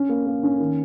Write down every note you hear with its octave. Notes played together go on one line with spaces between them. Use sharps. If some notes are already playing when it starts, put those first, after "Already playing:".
Already playing: C#4
A#3
A#3
C#4
D#3